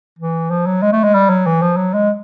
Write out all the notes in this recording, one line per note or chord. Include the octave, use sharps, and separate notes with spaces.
E3
F3
F#3
G#3
A3
G#3
G3
F#3
E3
F3
F#3
G#3